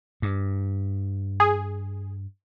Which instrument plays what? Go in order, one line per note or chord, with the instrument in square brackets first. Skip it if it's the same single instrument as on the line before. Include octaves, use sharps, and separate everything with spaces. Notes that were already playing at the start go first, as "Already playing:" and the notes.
[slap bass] G2
[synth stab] G#4